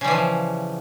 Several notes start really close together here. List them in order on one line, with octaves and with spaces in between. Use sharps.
C#3 G3 E3 F3